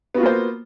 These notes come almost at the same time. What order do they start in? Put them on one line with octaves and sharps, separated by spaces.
B3 F#4 F4 A#3 C5